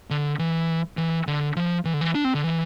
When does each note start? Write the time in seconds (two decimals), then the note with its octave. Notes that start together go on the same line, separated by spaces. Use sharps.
0.10 D3
0.39 E3
0.97 E3
1.27 D3
1.56 F3
1.85 E3
1.94 D3
2.01 E3
2.15 D4
2.24 C4
2.34 D3
2.44 E3